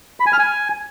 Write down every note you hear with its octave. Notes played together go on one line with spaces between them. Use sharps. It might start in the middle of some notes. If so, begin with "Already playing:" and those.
B5
G#5
F6
G#5